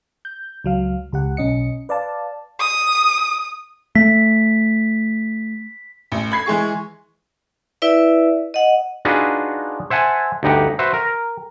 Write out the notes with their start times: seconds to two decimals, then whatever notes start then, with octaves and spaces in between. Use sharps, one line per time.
0.25 G6
0.64 C#2 F#3 F5
1.13 C#2 G4 F#5
1.37 B1 C#4 D#5 C#7
1.89 B4 D5 F5 A5
2.59 D#6
3.95 A3 B6
6.12 A1
6.32 B5 G#6 C7
6.46 E3 G#3 G#4 C#6
7.82 E4 B4 D5 E5
8.54 D#5 F#5
9.05 D4 D#4 F4 F#4 G#4 B4
9.90 C5 E5 F#5 G#5 A5
10.43 D2 G2 D#4 G4 F#5
10.79 F#4 B4 C5 E5
10.94 A#4